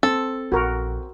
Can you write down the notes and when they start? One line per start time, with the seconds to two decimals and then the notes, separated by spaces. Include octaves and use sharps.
0.03 C4 A4
0.52 A#1 F#4 A#4